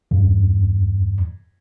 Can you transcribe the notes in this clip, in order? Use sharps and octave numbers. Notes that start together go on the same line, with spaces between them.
E2 G2